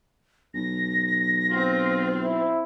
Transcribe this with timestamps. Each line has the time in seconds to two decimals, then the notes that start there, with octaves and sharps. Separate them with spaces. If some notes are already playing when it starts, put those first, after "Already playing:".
0.54 B1 A#6
1.50 C4 F4
2.21 E4